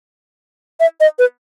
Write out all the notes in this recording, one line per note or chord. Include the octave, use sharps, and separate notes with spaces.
E5
D#5
B4